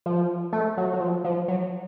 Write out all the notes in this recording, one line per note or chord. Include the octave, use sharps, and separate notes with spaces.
F3
A3
F#3
F#3
F3
F3
F#3